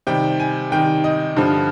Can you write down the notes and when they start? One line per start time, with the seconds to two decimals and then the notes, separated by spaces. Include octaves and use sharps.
0.07 C3 D#3 G3 G5
0.39 G#5
0.71 C3 D#3 G3 G5
1.04 D#5
1.36 G2 D3 F3